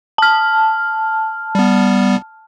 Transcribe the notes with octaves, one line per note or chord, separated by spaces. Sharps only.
A5 F6
G3 B3